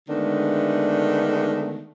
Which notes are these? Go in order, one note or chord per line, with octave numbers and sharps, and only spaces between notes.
D3 D#3 G#3 A3 B3 D4